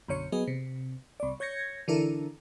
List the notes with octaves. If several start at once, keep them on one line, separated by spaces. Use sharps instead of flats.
B1 F#2 D3 C#5 C#7
F#3 B3 G#4 D#5
C3
C2 D5
C#5 G6 G#6 A#6 C#7
D3 E3 D4 E4 A4 A#4